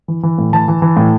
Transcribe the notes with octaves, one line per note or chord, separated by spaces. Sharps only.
E3
E3
A2
E3 A5
E3
E3
A2